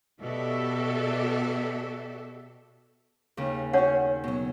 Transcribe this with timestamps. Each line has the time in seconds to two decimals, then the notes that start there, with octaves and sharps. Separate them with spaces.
0.20 B2 F#4 G4 A4 D5 E5
3.37 D#2 C#3
3.73 C#4 F#4 C#5 F#5
4.24 B2 F#3